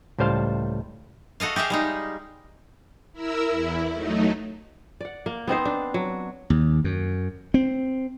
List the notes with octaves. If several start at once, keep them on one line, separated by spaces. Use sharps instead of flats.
C#2 A2 G3 C5 F5 A5
F#4 A4 D#5 F5
G4 G#4 E5 F5
G3 G#3 D#4
E4 A#4 E6
E2 E4
F#3 A3 D#4
D5 F#5
A#3
B3 C4 D#4 C5
D4
F#3
D#2
F#2
C4